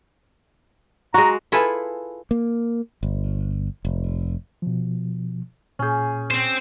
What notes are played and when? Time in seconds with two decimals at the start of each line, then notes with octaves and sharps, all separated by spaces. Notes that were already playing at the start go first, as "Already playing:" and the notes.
1.14 G#3 F#4 A#5
1.52 E4 F4 G#4 A4 B4
2.31 A#3
3.03 G1
3.85 F1
4.62 B2 F3
5.79 A#2 C#4 G#4 G6
6.31 C4 C5